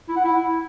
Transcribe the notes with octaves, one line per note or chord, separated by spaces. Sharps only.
E4
F#5
E4